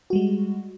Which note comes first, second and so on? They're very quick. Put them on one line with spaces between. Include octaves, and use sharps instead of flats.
F#4 G3 G#3